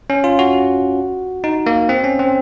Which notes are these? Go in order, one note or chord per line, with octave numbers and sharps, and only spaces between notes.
C#4
F4
F#4
D#4
A#3
C4
C#4
C4